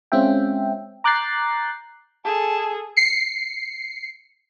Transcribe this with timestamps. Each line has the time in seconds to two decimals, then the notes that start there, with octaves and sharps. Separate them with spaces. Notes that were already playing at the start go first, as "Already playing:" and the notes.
0.12 G#3 C4 C#4 F4 E5 G5
1.04 A#5 D6 F#6 G6 A6 C7
2.24 G#4 A4 A5
2.97 C7 C#7